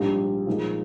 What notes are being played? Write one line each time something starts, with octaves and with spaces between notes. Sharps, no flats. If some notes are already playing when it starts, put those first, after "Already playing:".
Already playing: A#1 G#2 G3
A#2 F3 G#3 D#4